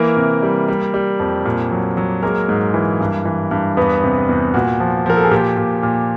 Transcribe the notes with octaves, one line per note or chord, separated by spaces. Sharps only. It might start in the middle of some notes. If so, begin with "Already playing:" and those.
Already playing: E3 A#3 A#4
C3
G3
G3
G3
F2
A#2
F#3
F#3
G#3 A#3 A#4
G#2
E3
G2
E3
G2
E2 B3 B4
C3
E2
A#2 F#4
F3
F3 A#4
A4
G#4
A#2 G4
A#2
A#2